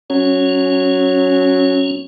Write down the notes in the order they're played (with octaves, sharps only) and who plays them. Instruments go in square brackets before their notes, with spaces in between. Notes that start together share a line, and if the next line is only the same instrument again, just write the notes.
[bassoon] F#3 [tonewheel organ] C#4